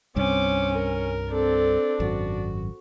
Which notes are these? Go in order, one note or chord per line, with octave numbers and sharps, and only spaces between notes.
C2 G2 C4 C#4 D6
A#4
C4 D4 A4
G#1 F#2 F#4